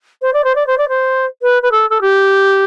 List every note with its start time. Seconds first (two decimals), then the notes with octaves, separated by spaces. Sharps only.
0.22 C5
0.33 D5
0.44 C5
0.55 D5
0.67 C5
0.78 D5
0.89 C5
1.42 B4
1.62 B4
1.71 A4
1.90 A4
2.01 G4